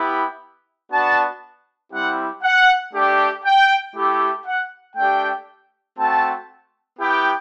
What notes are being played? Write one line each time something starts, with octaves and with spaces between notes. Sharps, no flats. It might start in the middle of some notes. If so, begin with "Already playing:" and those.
Already playing: B3 E4 G4
B3 D4 F#4 A5
G3 C4 E4 G4 F#5
F#5
A3 D4 G4
G5
A3 E4 G4
F#5
A3 D4 G4 G5
A3 C4 F#4 A5
B3 E4 G4 G5